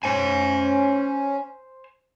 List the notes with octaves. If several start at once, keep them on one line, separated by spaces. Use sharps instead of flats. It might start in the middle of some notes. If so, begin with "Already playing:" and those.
C#4 C5 G#5